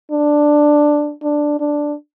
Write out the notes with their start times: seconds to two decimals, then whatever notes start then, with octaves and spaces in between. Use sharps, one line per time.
0.12 D4
1.23 D4
1.60 D4